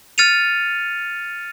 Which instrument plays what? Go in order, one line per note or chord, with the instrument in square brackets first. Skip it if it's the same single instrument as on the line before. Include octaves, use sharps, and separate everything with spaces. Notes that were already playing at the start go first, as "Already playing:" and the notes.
[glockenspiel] F6 A6 C#7 D#7 F7